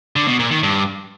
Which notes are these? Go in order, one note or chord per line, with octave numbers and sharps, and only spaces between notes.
D3
B2
A#2
D#3
G2